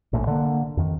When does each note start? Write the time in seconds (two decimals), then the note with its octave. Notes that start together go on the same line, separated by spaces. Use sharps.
0.13 A#1 A2
0.27 D3 A#3
0.77 F2 D#3